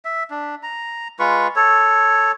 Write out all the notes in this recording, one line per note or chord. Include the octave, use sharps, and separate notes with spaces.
E5
D4
A#5
G#3 F4 B4 C#6
A4 C#5